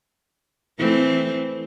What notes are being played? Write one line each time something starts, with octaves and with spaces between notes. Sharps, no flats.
E3 A3 C4